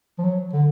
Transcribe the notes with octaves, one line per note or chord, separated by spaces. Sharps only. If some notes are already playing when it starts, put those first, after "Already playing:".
F3
F#3
D3